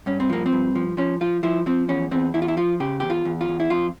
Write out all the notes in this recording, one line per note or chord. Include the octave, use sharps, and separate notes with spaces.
G2 C#4
C4
F3 A#3
C4
G2
F3
F3 C#4
F3 F4
F3 E4
F3 C4
E2 C#4
E2 C4
E2 E4
F4
E4
F3 F4
C#3 G4
E2 G4
F4
E2
F4
E2
E4
F2 F4